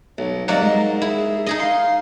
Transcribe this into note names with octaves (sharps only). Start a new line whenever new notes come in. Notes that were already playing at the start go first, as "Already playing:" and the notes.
B1 C#5
C2 F#3 A#3 D5 D#5 F#5
G#2 D#5
E4 G#4
D#4 G#4 D#5 E5
F5 C6